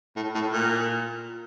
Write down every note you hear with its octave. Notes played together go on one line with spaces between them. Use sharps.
A2
A2
A#2